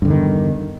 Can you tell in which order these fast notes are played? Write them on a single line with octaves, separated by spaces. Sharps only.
G2 D3 E2 D#3